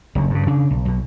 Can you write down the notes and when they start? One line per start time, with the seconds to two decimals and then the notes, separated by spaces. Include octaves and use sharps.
0.15 F#1 D2
0.30 G2 C#3
0.47 C#3 D4
0.71 B1
0.85 B1 B2